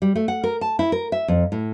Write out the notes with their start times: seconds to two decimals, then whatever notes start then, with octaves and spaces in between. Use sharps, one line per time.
0.02 G3
0.16 A3
0.28 F#5
0.44 A#4
0.61 A5
0.79 E4
0.92 A#4
1.12 E5
1.28 F2
1.52 A2